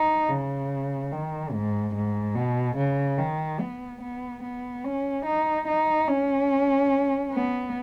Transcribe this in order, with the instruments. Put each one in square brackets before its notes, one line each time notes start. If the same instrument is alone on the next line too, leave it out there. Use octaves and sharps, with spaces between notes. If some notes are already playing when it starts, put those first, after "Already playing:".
Already playing: [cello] D#4
C#3
D#3
G#2
G#2
B2
C#3
D#3
B3
B3
B3
C#4
D#4
D#4
C#4
B3